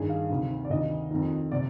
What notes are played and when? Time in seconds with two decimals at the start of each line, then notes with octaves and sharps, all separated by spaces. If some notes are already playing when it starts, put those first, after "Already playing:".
Already playing: G2 D#3 G#4
0.09 F5
0.30 D2 C3 D#3
0.65 D5
0.70 D2 C3 D#3 D#5
1.11 F2 D#3
1.52 C3 D5